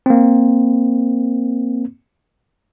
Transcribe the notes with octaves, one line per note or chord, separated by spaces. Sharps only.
A#3 C4